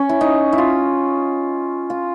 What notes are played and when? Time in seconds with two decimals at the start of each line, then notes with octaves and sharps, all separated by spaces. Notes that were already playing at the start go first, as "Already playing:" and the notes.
Already playing: C#4
0.09 E4
0.21 D#4
0.53 E4
0.58 F4
1.90 F4